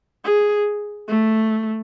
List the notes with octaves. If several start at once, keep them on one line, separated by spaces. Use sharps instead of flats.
G#4
A3